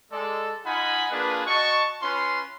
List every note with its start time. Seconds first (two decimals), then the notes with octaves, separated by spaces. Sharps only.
0.12 G#3 A4 D5
0.66 D#4 F4 D#5 F#5 G#5 B5
1.11 A#3 D4 F4 G#4 B4
1.47 F#4 D#5 A5 C#6
2.02 C#4 F4 B4 C6